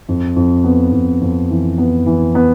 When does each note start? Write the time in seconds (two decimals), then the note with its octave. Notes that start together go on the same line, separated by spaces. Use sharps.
0.09 F2
0.36 F2
0.64 B3
0.93 F2
1.21 F2
1.51 E3
1.78 B3
2.06 E3
2.35 B3